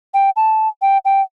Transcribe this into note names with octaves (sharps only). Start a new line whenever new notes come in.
G5
A5
G5
G5